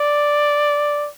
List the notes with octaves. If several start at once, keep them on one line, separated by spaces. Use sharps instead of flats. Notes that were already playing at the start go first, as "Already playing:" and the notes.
Already playing: D5